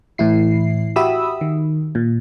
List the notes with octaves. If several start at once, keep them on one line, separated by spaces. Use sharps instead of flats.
A2 E3 E4 C7
F#4 G4 E5 B5 D#6 E6
D#3
A#2